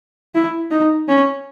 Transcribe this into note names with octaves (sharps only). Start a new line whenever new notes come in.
E4
D#4
C#4